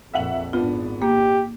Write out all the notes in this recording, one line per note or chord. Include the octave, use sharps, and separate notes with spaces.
A#1 F2 A#2 E5 F#5 F#7
G#1 B3 D4 F4
A#3 G4